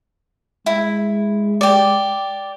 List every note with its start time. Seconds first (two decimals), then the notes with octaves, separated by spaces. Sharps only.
0.66 G#3 E4
1.61 G4 D5